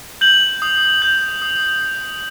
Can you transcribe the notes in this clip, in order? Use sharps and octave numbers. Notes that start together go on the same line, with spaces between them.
G6 F#7
D#6
G6
D#6